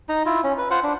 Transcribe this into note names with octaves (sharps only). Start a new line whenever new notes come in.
D#4 A#5
E4 F4
C#4
B4
F4 C5 F#5
D4